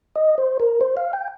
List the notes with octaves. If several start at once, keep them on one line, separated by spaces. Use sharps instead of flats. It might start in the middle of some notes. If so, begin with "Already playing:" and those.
D#5
C5
A#4
C5
F5
G5